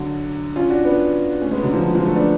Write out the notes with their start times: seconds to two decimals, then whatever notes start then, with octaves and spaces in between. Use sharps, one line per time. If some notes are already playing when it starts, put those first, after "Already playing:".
Already playing: D3 F#3
0.56 C#4 F4
0.70 D4 F#4
0.84 B3 D4
1.41 A3 C#4
1.51 G#3 B3
1.62 D3 F#3
1.73 F3
1.84 D3 F#3
1.95 F3 G#3
2.06 F#3 A3
2.16 B3 D4